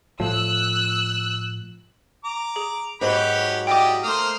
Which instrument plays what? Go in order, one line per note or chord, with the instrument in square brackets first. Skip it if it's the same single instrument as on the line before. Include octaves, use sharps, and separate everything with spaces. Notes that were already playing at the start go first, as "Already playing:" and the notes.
[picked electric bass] A2 F3 [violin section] E6 F#6
[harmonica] A#5 D6
[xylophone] G#4
[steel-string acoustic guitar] G#2 F#3 [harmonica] G4 B5 [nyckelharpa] B4 C#5
[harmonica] G3 E4 D5 [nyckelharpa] D#5 [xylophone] G5 D6
[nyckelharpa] A3 C5 [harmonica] A#3 D#6 F6